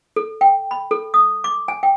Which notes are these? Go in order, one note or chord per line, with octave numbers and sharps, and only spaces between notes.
A4
G5
B5
A4
D#6
D6
G#5
G5